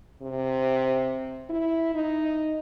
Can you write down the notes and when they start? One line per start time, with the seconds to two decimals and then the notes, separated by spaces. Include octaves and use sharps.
0.22 C3
1.50 E4
1.94 D#4